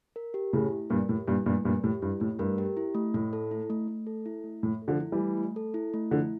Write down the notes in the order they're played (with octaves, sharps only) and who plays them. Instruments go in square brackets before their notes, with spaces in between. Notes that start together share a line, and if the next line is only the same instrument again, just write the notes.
[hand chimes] A#4
G4
[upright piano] A2 C#3 [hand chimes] E4
[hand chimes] A3
[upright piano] G2 A#2 [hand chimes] A#4
[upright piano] A2 [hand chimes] G4
[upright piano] G2 A#2 [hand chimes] E4
[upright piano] G2 A#2 [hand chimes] A3
[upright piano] G2 A#2 [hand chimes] A#4
[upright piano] A2 [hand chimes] G4
[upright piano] G2 [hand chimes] E4
[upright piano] A2 [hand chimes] A3
[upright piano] G2 [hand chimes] A#4
[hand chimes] G4
E4
A3
[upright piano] A2 [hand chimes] A3
[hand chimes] A4
E4
A3
A3
A4
E4
A3
[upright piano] A2 [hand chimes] A3
[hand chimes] A4
[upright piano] D3 F3
[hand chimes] E4
[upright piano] E3 G3
[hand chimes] A3
A3
A4
E4
A3
[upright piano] D3 F3 [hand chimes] E4